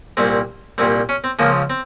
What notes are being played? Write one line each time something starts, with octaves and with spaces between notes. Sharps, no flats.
C2 A#2 G3 C4
C2 A#2 G3 C4
C#4
C4
C#2 C#3 F3 A#3
C4